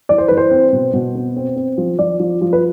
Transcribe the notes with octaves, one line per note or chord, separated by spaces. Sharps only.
E3 D5
C5
E3 B4
C5
C4
B2
B2
B3
C4
C4
F3
F3 D5
F3
F3
B4